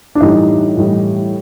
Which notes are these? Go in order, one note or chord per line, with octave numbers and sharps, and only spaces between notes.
D4
A2 E3 G3 D#4
A2 E3 G3